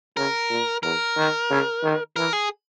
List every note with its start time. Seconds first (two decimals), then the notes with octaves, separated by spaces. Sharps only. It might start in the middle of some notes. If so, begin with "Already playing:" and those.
0.17 C#3 A#4
0.50 A#2
0.83 E2 A#4
1.17 D#3
1.50 C#3
1.83 D#3
2.16 E3 A#4
2.33 G#4